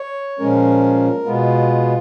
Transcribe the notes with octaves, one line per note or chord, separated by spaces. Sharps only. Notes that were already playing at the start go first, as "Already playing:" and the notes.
Already playing: C#5
A#2 F3 G#3 C#4 A#4
B2 G#3 B3 F4